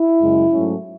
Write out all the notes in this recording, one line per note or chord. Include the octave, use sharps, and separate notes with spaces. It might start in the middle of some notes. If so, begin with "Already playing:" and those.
Already playing: E4
F#2 C#3 G#3
G#2 F#3 A3 C#4